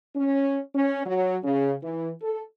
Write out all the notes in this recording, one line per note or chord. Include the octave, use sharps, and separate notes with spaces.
C#4
C#4
F#3
C#3
E3
A4